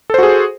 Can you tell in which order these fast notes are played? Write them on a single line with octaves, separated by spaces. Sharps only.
A4 C5 F#4 G#4